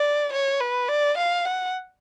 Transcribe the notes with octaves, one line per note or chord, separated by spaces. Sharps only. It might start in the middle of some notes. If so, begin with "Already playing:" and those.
Already playing: D5
C#5
B4
D5
F5
F#5